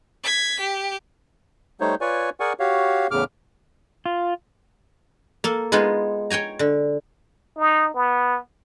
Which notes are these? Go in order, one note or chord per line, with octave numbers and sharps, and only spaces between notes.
G#6 B6
G4
G3 A3 D#4 C5 C#5
F4 B4 C#5 D5 G#5 C#6
G#4 A#4 D5 F#5 G#5 C#6
F#4 G4 C#5 F5
E2 A2 C#3 D6 F6
F4
A#3 A4
G#3 B3 D#4 F4 G#4
C#5 G5 G#5 A#5
D3
D#4
B3